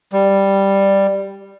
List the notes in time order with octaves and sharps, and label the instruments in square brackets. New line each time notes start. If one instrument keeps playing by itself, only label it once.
[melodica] G3